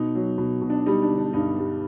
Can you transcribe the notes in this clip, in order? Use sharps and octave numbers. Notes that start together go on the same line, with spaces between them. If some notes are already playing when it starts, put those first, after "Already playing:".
Already playing: B2 D#4
F#3
B2
B2
D4
G3 D#4
D4
D3
D4
G2 D#4
G3